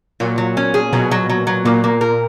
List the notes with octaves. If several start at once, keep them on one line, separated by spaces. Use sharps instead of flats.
A#2 F#3
F#3
C#4
G#4
B2 F#3
F#3
F#3
F#3
A#2 A#3
A#3
A#4